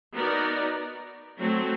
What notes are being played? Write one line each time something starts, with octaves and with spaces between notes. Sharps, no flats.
B3 D#4 F#4 A#4 D5
F#3 A3 C4